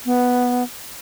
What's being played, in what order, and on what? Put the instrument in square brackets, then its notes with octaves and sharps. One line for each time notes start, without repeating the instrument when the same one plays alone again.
[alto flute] B3